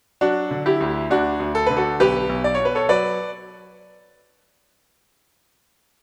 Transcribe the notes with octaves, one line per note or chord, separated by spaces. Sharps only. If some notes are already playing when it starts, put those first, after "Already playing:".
F#3 D4 F#4
D3
E4 G4
D2
D2 D4 F#4
D2
A4
D3 B4
F#4 A4
B1 G4 B4
B1
D5
B2 C#5
B4
A4 C#5
F#3 B4 D5